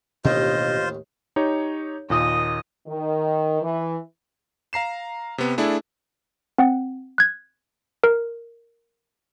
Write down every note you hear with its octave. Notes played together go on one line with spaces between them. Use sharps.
A1 D#2 B2 C#4 D4 F4 C5 D#5
D#4 G4 C#5
D#2 A#2 D#5 D#6
D#3
E3
F5 A#5 C7 E7
C3 B3
A3 D4 E4 G#4
C4 F#5
F#6 G#6
A#4